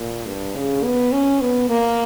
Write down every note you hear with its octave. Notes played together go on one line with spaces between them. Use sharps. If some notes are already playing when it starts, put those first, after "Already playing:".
Already playing: A#2
G2
C#3
B3
C#4
B3
A#3